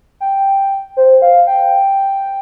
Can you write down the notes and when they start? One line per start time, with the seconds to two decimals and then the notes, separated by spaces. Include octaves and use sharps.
0.21 G5
0.97 C5
1.22 F5
1.47 G5